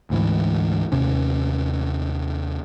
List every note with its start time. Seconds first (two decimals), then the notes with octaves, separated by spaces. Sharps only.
0.10 D2 G#2 E3
0.92 D#2 C3 C#4